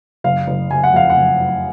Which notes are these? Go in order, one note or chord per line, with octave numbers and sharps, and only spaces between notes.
F#1 F5
F#1
F#1 G#5
F#5
F2 F5
F#5
F#1
F#1